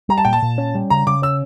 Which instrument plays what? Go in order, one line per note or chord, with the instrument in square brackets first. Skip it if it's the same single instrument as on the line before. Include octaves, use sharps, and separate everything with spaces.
[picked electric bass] G3 [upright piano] A#5
[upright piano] A5
[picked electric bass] A#2 [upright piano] G5
[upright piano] A5
[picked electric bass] A#2
C#4
G3
[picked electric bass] C#3 [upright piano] A#5
[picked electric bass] C#3 [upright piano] D6
[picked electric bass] C#4 [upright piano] E6